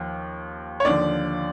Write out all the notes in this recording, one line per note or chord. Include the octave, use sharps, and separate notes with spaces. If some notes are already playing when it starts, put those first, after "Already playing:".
Already playing: D#2 F3
C#5
D#2 D3 F3 D5